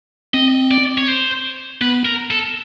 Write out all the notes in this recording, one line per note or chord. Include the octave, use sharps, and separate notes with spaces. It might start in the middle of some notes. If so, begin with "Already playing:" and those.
C4 D#5
D5
C#5
C5
B3 B4
A#4
A4